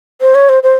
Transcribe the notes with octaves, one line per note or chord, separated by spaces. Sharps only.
C5
C#5
C5
C5